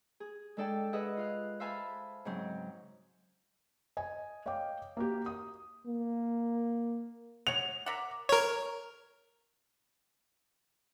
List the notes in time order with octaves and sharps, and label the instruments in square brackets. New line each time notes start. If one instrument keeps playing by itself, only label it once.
[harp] G#4
G#3 D4 A4 D5 G5 A5
G#4 B4 D#5 E5 F#5
F4 F5 F#6
C5 E5 F5 G#5 A5 B5
G#2 C#3 F#3 C4
[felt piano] D#5 G#5
C#5 D#5 F5 G5 D6
A#3 F#4 G4
D#6
[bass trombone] A#3
[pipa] C#5 F#5 [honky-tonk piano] F7
[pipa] A#4 E5 F#5 [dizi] D6
[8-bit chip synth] A#4 C#5